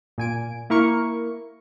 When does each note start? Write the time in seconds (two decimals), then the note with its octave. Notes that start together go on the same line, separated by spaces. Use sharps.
0.18 A#2 G#5 D7
0.70 A#3 E4 A#4 C#6 C#7